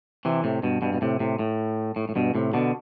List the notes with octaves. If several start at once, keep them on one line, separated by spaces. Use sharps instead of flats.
C3 E3
A2 C3
G2 B2
G2 B2
B2
A2 C3
A2 C3
A2
A2
A2
G2 B2
A2 C3
B2 D3